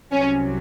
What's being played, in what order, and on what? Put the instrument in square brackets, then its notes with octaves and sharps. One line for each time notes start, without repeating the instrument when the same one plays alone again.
[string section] C2 C3 F#3 C#4